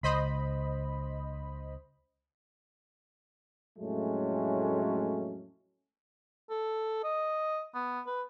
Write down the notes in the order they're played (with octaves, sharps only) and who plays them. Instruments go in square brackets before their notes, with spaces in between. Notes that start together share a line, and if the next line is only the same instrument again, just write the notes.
[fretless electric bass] C#2 [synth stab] C5 D#5 B5
[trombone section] F2 A2 F#3 G#3 A3 C#4
[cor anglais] A4
D#5
B3
B4